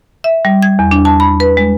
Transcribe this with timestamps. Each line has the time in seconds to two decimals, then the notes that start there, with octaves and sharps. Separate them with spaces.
0.24 E5
0.45 G3
0.63 G#6
0.79 E2
0.91 D4
1.05 A5
1.20 B5
1.40 B4
1.57 G#3